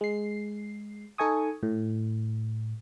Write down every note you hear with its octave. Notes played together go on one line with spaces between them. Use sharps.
G#3 C7
D#4 A4 D#5 G#5 C#6 D#6
A2